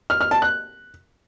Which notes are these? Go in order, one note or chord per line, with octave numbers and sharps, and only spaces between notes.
F6
F6
A5
F#6